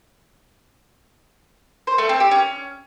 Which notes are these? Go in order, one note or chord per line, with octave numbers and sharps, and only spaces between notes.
C5
A3
C4
G4
C#4